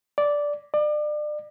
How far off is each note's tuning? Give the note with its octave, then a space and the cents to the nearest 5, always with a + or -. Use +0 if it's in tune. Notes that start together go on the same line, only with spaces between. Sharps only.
D5 -5
D5 +35